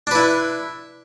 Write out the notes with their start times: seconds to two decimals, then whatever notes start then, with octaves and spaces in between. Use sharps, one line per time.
0.07 D4
0.11 B4
0.15 E4